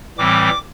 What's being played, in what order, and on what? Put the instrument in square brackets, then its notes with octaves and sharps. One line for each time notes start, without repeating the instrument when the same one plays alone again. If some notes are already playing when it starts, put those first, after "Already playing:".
[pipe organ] A2 E3 G3 C4 D6